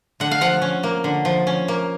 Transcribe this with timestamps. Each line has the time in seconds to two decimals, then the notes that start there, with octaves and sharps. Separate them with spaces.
0.20 D3 F#5
0.31 F5
0.41 F3 F#5
0.62 C#4
0.83 A#3
1.04 D3
1.25 F3
1.47 C#4
1.68 A#3